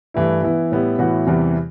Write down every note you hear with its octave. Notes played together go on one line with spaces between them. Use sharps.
G2 E3 A3 E4
E3 B3 E4
A2 G3 B3 E4
A2 E3 B3 F#4
E2 C3 E3 G3